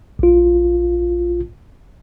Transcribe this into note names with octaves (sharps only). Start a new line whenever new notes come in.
A#1 F4